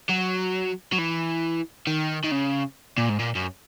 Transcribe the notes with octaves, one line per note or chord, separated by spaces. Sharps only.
F#3
F#3
E3
D#3
D#3
C#3
A#2
G#2
A#2
F#2